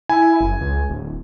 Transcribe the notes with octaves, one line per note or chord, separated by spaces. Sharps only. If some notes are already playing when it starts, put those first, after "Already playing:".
E4 G#5
F#1
C#2
D1